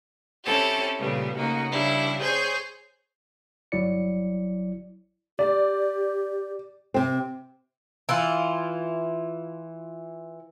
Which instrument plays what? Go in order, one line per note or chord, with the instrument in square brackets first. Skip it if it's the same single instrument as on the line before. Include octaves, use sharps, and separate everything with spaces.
[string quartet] C4 C#4 E4 G4 A4
A#2 C#3 G3 A3 B3
C#3 A3 A#3 D#4 F#4
G2 C#3 G3 D4 E4
G#4 C5 C#5 G#5 G6
[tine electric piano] G1 F#3 E4 D5 C#7
[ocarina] G4 [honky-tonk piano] D5
[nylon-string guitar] C3 C4
[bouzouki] E3 E4 F4